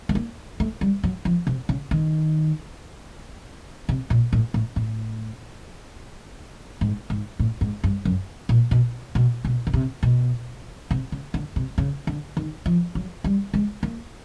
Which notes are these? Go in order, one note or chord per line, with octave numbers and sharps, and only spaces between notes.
A3
A#3
A3
G3
F#3
F3
C3
C#3
D#3
C3
A#2
A2
A2
A2
G#2
G#2
A2
G#2
G2
F#2
A#2
B2
B2
B2
C#3
C3
B2
C3
C#3
D3
C3
C#3
D3
D#3
F3
F#3
G3
G#3
A#3